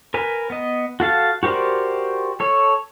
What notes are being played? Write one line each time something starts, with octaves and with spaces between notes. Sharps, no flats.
A#4 B4 G#5
B3 D#5
F#4 A4 F5 A5
F#4 G4 A#4 C5 D5
A4 C#5